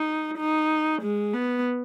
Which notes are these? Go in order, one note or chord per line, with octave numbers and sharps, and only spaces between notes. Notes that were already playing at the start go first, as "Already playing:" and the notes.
Already playing: D#4
D#4
G#3
B3